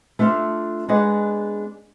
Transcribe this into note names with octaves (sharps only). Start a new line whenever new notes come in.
A3 D4 F4 E5 F5
G#3 B3 D4 G#4 D#5 F#5